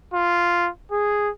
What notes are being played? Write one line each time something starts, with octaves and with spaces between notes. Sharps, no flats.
F4
G#4